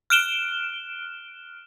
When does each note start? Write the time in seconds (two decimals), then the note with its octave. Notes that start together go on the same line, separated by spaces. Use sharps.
0.10 F6 F#6 D7 E7 G7